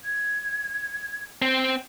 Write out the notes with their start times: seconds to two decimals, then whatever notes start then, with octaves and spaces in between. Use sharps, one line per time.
0.04 G#6
1.42 C4